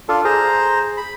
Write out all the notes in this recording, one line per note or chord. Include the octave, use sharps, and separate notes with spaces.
D4 F4 A4
G#4 C5 A#5
B5